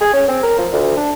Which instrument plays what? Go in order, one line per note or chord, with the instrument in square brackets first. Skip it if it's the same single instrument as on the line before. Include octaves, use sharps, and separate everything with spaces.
[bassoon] G#4
C#4
C4
A#4
F3
D2
D4